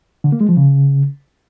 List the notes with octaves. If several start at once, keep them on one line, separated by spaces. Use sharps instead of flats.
D3
A#3
G#3
F3
C#3